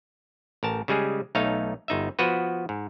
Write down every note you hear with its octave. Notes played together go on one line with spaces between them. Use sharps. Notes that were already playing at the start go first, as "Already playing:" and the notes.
A1 A#4 A5
C#3 G3 G#3 G#4
B1 A3 D#4 C#5 F5
G1 D#4 E5
F3 B3 F#4 B4
G#2